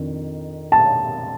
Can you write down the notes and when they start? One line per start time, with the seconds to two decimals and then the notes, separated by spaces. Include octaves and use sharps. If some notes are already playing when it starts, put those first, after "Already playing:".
Already playing: F2 D#3 D4
0.72 A5